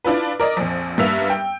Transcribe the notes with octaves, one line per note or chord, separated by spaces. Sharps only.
D4 E4 F4 B4
A#4 D5 D#5
A#1 F2
G2 A#3 B3 E5 E6 F7
G5